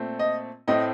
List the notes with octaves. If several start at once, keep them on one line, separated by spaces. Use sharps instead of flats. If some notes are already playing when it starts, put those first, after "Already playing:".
Already playing: A#2 A3 C4
D#5
A2 A3 C4 D#5